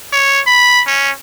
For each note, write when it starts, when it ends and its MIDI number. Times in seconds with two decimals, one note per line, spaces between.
0.12 0.40 73
0.47 0.82 83
0.87 1.10 61